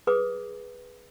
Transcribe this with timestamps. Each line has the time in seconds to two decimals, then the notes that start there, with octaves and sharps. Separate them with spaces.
0.07 G#4 B4 D6 D#6